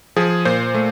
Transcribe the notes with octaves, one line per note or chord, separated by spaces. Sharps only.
F3 G#4
A#2 C5
A3